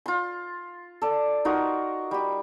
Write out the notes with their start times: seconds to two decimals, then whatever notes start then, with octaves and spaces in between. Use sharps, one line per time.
0.06 F4 C6
1.02 A4 D5
1.45 D#4 F4 F#4 A#4
2.11 G3 G4